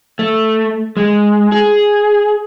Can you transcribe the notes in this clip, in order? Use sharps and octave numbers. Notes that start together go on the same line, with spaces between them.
A3
G#3
G#4